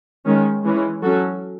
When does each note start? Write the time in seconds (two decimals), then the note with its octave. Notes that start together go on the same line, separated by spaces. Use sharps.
0.26 D#3 G#3 C#4
0.64 E3 G#3 C#4
1.02 F#3 C#4 F#4 A4